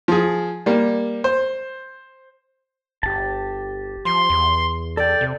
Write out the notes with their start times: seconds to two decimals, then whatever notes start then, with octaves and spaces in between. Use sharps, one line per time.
0.08 F3 G#4
0.66 G3 A#3
1.24 C5
3.03 G1 G4 A5
4.05 F3 C6
4.30 E2
4.97 A4 D5 G5
5.21 C3